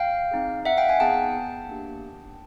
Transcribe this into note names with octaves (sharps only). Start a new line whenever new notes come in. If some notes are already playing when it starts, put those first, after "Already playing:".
Already playing: F5 G5
C4 D#4 G#4
E5 F#5
F5 G5
F#5 G#5
B3 D#4 G#4 G5 A5
A#3 D4 G4